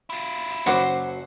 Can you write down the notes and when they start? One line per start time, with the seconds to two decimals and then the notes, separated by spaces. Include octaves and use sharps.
0.10 E4 F4
0.66 F#1 F#3 F#4 C5 F#5 D6 C7